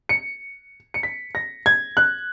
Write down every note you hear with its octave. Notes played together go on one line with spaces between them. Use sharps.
C#7
C#7
B6
A#6
G#6
F#6